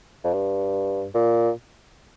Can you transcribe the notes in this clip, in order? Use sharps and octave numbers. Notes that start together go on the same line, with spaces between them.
F2
G2
A#2